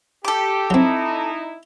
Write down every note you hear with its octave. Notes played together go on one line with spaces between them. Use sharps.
G4 A4 D6
F#3 C4 D#4 E4